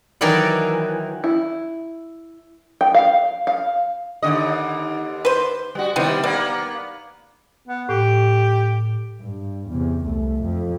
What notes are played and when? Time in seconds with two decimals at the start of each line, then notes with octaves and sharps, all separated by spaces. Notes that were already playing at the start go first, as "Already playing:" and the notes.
0.21 D#3 E3 F#3 A#4 D5 F#5
1.24 E4
2.81 G5
2.94 F5
3.47 F5
4.22 D#2 D3 D#5
5.25 B4 C5
5.75 G3 F#4
5.96 C3 D#3 G3 B3 C4 E4
6.24 G3 A#3 B3 B4
7.68 B3
7.89 A2 G4
9.20 G2
9.69 E2 C3
10.04 C2 A3
10.42 F2